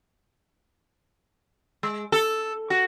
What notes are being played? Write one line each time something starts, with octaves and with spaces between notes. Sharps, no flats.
G#3
A4
F#4